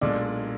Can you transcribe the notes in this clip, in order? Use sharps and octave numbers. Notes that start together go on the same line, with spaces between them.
B1 A#2 G#3 D4 D5